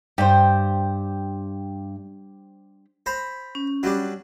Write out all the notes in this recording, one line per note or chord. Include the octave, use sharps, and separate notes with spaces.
G2 G4 C5
C5 A#5 B5
C#4
F#3 G3 D4